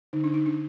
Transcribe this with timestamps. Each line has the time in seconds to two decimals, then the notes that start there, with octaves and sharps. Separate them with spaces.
0.13 D3 D#4
0.24 D4
0.30 D3 D#4
0.46 D3 D4